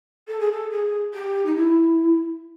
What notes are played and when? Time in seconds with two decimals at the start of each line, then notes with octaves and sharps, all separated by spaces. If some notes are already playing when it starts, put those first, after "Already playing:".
0.28 A4
0.40 G#4
0.52 A4
0.71 G#4
1.14 G4
1.46 D#4
1.56 E4